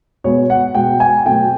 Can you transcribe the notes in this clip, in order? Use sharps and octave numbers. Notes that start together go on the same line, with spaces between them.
B2 G#3 B3 C#5
F#5
B2 G#3 B3 G5
G#5
B2 F#3 A3 C4 G5